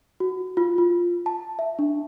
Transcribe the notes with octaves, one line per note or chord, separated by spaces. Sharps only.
F#4
F4
F4
A5
E5
D4